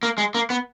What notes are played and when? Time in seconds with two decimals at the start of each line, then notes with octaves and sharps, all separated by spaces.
0.03 A#3
0.18 G#3
0.35 A#3
0.50 B3